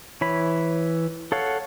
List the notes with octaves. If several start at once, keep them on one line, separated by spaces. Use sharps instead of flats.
E3 C#5 B5
A4 C#5 F5 F#5